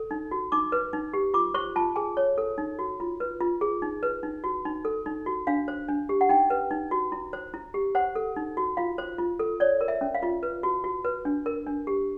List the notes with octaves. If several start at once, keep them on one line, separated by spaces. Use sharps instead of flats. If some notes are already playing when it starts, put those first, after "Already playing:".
Already playing: A4
D#4
F#4
D#4 D6
B4
D#4
G4
F4 D6
C5 C#6
F4 A5
G#4 G#5
C#5
A4
D#4
F#4
F4
B4
F4
G#4
D#4
B4
D#4
F#4
D#4
A4
D#4
F#4
D4 F5
C5
D4
G4
F#5
D#4 G5
B4
D#4
F#4
E4
C5
E4
G4
C5 F#5
A4
D#4
F#4
F4 F5
C5
F4
A4
C#5 D5
A#4
E5
C#4
F5
F4
B4
F#4
F#4
B4
D4
A#4
D4
G4